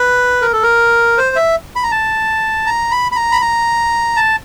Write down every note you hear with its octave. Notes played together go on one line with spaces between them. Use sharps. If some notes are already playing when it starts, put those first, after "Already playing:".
Already playing: B4
A#4
A4
A#4
C5
E5
B5
A#5
A5
A#5
B5
B5
A#5
B5
A#5
A5